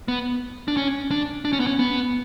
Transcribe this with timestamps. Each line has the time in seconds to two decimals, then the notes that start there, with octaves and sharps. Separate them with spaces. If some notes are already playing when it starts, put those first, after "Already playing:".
0.08 B3
0.68 D4
0.77 C#4
1.11 D4
1.45 D4
1.53 C#4
1.60 B3
1.67 C#4
1.79 B3